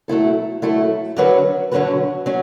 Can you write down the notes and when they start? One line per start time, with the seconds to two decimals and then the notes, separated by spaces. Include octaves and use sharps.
0.08 F#3 A3 E4 A4
0.62 F#3 A3 E4 A4
1.17 D3 F#3 C#4 F#4 B4
1.72 D3 F#3 C#4 F#4 B4
2.26 F#3 C#4